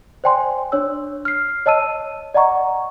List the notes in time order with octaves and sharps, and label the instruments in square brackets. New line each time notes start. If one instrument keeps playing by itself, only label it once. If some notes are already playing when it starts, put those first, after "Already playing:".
[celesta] C5 D5 G5 G#5 C6
D4 C#5 E6
F6 C7
C#5 D#5 A5 E6 D#7
D5 D#5 F#5 A#5 C#6